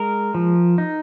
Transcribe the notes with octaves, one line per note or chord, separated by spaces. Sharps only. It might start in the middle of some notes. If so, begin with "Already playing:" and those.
Already playing: G#3 A#4
F3
D#4